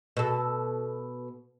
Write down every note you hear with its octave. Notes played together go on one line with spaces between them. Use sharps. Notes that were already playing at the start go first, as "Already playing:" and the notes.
B2 A4